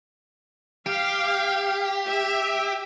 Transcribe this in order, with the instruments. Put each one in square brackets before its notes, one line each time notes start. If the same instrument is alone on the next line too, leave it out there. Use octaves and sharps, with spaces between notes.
[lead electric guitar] G4 [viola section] F5
[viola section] E5